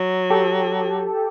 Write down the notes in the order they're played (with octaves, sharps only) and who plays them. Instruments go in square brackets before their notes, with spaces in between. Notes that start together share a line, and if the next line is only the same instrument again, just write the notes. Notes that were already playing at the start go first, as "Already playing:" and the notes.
Already playing: [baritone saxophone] F#3
[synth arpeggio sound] G4 A4